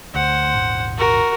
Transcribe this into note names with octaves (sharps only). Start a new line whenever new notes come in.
D2 C5 F#5
D#1 G#1
F#4 A#4